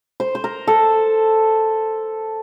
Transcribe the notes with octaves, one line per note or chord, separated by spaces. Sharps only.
C5
C5
A#4
A4